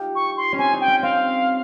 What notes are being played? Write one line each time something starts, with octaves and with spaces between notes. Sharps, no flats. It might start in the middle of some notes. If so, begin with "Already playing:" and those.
Already playing: D#4 F4 G4
C#6
C6
C#4
C4 G#5
D#4
G5
C#4
C4 F5